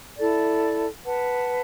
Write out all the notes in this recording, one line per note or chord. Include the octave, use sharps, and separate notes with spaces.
E4 A4 D5
B4 F#5 A5